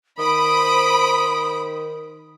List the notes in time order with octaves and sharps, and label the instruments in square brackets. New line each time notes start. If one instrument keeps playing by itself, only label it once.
[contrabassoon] D#3 [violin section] C5 B5 D7 [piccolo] D#6